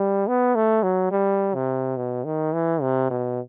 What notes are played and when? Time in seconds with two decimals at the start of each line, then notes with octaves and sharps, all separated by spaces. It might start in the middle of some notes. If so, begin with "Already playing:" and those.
Already playing: G3
0.27 B3
0.55 A3
0.83 F#3
1.11 G3
1.55 C3
1.97 B2
2.25 D#3
2.53 E3
2.82 C3
3.10 B2